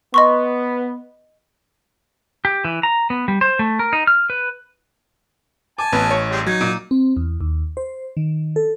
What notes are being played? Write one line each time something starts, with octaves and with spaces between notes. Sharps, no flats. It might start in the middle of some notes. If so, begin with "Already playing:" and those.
B3 D#5 C6 C#6
G4
E3
A#5
B3
G3
C5
A3
A#4
D#4
F6
B4
G#5 A5 D6
A1 B3
C#5
G3 G#3 C4
F#3 D#4 G#6
A#2
C4
E2
D#2
C5
D#3
A4